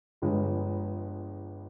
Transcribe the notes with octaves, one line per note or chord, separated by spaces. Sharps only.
G1 G2 F3 G#3